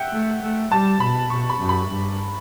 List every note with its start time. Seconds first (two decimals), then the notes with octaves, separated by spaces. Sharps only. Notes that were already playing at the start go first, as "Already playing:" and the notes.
Already playing: E5 F#5 G5
0.13 A3
0.43 A3
0.72 G3 A5
1.00 B2 B5
1.30 B2 C#6
1.49 B5
1.59 F#2
1.69 B5
1.88 G2